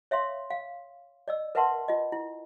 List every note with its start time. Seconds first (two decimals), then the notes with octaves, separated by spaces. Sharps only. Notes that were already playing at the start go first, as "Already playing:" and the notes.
0.11 C#5 E5 F5 C6
0.50 F5
1.28 D5 D#5 E6
1.55 A#4 B4 E5 F#5 A5 C6
1.88 F4 D#5
2.12 E4